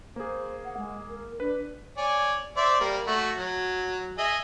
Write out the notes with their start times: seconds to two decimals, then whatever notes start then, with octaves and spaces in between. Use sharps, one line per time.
0.16 A#3 G#4 C5
0.65 F#5
0.77 G#3
1.08 A#4
1.40 D4 B4
1.97 C#5 D5 G#5
2.57 C5 D5 E5
2.80 G3 A#3
3.07 A3 F#4
3.37 F#3
4.18 G#4 D#5 E5